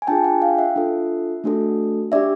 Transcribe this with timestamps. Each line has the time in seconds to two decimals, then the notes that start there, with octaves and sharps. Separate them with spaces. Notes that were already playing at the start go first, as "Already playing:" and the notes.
0.02 G#5
0.07 D4 F4 G#4 G5 A5
0.24 F#5 G#5
0.41 F5 G5
0.58 E5 F#5
0.76 D4 F4 A4
1.44 A3 D4 F#4 A4
2.12 D4 G4 D5 E5